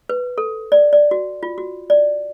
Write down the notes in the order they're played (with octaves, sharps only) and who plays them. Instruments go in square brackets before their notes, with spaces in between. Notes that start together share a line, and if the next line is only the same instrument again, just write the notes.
[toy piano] B4
A4
D5
D5
F#4
F4
F#4
D5